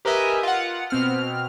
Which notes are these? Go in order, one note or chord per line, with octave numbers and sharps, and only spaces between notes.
G4 A#4 B4 D#5 E5 G#5
F4 F#5
B2 C4 F6